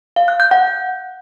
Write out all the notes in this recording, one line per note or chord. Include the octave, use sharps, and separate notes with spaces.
F5
F#6
G6
F#5